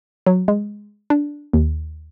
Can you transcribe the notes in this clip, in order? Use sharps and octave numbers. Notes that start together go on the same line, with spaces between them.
F#3
G#3
D4
D#2